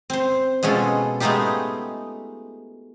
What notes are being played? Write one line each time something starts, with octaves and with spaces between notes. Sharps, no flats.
C4 C5
B2 G#3 C#4 F4 A4
G#3 A3 B3 D#4 F4 G4